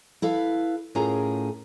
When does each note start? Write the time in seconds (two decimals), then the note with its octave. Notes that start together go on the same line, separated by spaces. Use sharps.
0.22 E4 A4 B4 F5
0.95 A2 C#4 F4 G#4 A#4 A#5